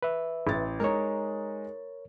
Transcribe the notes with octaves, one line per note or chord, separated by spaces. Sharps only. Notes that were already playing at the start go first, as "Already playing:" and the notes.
B4 E5
A1 A6
G#3 D#4 A#4 C#5